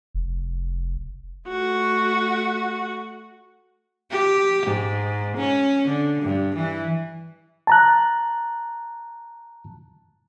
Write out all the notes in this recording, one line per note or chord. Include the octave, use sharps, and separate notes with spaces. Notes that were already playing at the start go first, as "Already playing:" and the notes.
F1
A3 F#4
G4
G#2
C#4
D3
G2
E3
A5 A#5 F#6